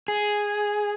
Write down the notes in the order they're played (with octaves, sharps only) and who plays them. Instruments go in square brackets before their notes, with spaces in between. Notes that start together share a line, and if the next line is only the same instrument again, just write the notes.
[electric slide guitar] G#4